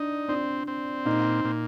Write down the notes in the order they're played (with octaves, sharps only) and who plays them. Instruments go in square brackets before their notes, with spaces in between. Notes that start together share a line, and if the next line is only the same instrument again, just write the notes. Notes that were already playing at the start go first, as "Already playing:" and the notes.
Already playing: [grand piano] D4 [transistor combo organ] D#4
[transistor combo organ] C4 [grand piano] D4
[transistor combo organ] C4
[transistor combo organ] A#2 [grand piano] D#4
[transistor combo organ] A#2